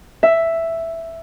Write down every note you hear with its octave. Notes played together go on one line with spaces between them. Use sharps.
E5